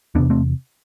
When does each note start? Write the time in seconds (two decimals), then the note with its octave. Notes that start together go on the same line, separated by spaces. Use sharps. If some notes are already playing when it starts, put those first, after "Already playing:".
0.15 E2 C3 B3 D4
0.30 A3 C4